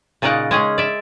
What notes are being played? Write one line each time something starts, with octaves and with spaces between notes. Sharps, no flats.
A#2 C#3 D#4 D5 F#5 A#5
G#3 C#4 G#4
D5 E5